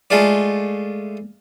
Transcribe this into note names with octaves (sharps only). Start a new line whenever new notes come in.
G#3 A3 F4 D5